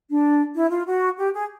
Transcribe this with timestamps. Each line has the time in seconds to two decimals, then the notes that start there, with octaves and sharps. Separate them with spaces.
0.08 D4
0.55 E4
0.70 F4
0.86 F#4
1.17 G4
1.33 G#4